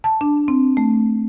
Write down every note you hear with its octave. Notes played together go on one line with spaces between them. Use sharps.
A5
D4
C4
A3